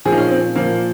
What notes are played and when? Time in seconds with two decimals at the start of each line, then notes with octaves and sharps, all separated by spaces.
0.05 A#2 F3 G#4
0.12 D#4
0.17 C#4
0.31 C4
0.55 A#2 F3 A#3